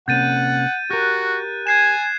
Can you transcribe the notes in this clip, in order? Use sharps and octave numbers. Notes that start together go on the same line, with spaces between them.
C3 A#3 C#4 F#5 G6 A6 D#7
F#4 G4 A#4 F#6
G#5 G#6 C7 E7